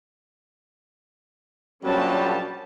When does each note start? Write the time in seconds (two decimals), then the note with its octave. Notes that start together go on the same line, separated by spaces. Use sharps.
1.84 A#1 F#3 G3 C#4 A5